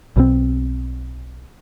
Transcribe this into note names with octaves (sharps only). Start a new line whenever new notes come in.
B1 B2 D#3 C4